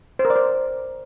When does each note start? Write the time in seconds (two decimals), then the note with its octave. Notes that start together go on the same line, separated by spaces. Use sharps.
0.19 C5
0.25 A#4
0.30 D5
0.36 C5